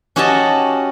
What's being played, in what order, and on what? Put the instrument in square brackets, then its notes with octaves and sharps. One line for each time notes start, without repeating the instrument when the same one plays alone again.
[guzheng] C#4 F#4 G4 C#5 D#5 A5